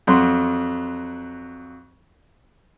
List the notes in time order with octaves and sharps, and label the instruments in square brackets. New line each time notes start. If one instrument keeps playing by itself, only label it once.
[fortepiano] F2 F#3 C6